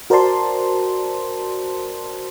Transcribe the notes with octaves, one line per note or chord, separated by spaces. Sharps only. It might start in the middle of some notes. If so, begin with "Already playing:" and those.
F#4 A#4 C5 D5 A5 C6